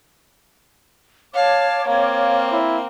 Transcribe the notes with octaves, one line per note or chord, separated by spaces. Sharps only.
C#5 F5 A5 D6
A#3 C4 F5
E4